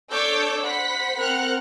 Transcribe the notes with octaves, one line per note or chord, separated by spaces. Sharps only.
D4 A4 C#5 D6 E6 G6
C5 F#5 B5 B6
C4 A#4 F#5 F6 F#6